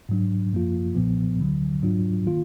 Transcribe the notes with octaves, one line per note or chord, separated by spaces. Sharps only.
G#2 F#3 D4
F#2 F3 A#3 F4
B1 A#2 F3 B3
D2 D3 F#3
G#2 F#3 D4 F4
D#3 A#3 F4